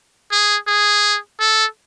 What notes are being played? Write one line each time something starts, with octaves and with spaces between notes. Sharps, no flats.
G#4
G#4
A4